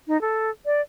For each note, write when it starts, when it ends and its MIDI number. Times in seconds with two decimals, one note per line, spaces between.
0.08 0.20 63
0.21 0.50 69
0.66 0.81 74